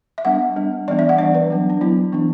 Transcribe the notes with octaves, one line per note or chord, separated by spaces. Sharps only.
E5
G3 B3 D4 F#5
G3 B3 D4
E3 G3 B3 D4 D5
E5
F#5
E3 G3 B3 D4 D5
B4
F#3 B3 D4
D4
F#3 B3 D4 E4
E3 B3 D4